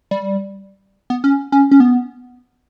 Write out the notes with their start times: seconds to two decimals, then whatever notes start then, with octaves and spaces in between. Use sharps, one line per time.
0.11 G3
1.10 B3
1.24 C#4
1.52 C#4
1.71 C#4
1.80 B3